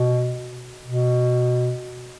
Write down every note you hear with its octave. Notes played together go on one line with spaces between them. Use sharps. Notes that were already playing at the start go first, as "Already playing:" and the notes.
Already playing: B2
B2